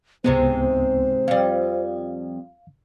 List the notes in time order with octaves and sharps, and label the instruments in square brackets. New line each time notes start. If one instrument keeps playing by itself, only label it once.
[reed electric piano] C#2 B3 [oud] G#2 C3 G#3 [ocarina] C5
[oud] F2 G3 [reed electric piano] F5